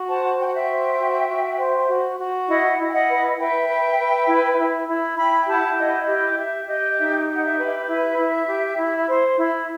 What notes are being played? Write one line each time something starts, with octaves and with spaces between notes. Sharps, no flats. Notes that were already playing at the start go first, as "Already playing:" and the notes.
Already playing: F#4
C5 F#5 A5
F#4 G5
F#5
E5 G5
C5
F#4
F#4
C5
F#4
F#4
E4 D#5 F#5
E4
G5
D#5 F#5
B4
B4 E5 G5
B4
B4
E4
E4
E4
E4 G5 B5
G5
G4 F#5 A5
E4 D#5 F#5
G4 D#5
G4 E5
G4 D#5
D#4 E5
G4
F#5
E5
B4
E5
E4 E5
E4
G4
E4
C5
E4